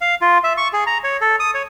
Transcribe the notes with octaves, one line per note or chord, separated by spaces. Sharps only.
F5
F4
E5
C#6
G#4
A#5
C#5
A4
D#6
C#5